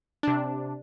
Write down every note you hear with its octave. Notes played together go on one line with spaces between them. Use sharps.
C3 D4